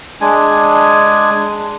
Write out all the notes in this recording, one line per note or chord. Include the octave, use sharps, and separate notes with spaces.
G#3 D4 G#5